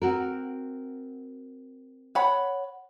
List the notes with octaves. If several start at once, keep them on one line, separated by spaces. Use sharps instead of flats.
C4 F#4 A#4
C#5 F#5 B5